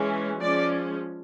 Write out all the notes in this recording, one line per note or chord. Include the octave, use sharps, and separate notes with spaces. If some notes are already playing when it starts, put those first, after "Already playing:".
Already playing: E3 G#3 C#4
F3 G#3 C#4 D5